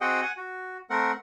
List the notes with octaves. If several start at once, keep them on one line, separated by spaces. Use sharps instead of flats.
C4 F#4 G#4 D#5 F#5 G5
F#5 G#5
F#4
A3 C4 A#4 F#5